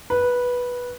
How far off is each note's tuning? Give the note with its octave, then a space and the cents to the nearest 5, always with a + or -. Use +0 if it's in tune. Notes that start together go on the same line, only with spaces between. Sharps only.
B4 -10